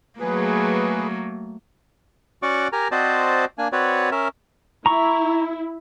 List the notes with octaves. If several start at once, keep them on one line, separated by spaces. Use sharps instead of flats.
F#3 A3 A#3 G#4 B4
C#4 F#4 D5 F#5 C#6 D6
G4 A#4 G#5 A#5
C4 F#4 C5 D5 D#5 A5
A#3 D4 G#5
C4 F#4 B4 C#5 D5
C#4 A#4 E5
E4 A#5 C#6